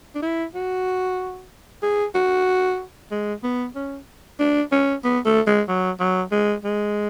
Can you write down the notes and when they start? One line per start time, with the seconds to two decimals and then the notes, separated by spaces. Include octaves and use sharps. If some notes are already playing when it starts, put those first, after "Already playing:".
0.15 D4
0.23 E4
0.55 F#4
1.83 G#4
2.15 F#4
3.12 G#3
3.44 B3
3.76 C#4
4.40 D4
4.72 C#4
5.04 B3
5.26 A3
5.47 G#3
5.69 F#3
6.00 F#3
6.32 G#3
6.65 G#3